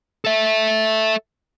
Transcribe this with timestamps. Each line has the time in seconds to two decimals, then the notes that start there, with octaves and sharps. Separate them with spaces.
0.25 A4 E5